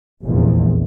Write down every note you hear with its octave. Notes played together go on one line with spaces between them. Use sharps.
F1 A#1 E2